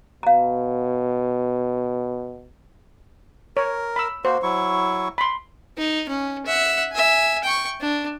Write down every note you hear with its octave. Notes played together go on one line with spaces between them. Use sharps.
B2 F5 A#5
A#4 C#5
B5 E6
A#3 F#4 C5
F#3 E4 C#6
B5 C6
D#4
C#4
E5 F#5
E5 G#5
G5 C#6
D4